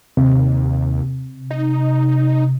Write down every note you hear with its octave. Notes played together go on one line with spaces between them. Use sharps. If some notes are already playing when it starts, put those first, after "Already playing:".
D#2 C3
D#4